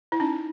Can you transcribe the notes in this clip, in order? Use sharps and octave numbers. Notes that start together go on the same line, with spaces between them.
E4
C#4 D#4